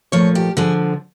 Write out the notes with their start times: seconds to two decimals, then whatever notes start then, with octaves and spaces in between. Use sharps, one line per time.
0.12 A#2 F3 A3 C#5
0.35 G4
0.57 D3 F3 G#3 G#4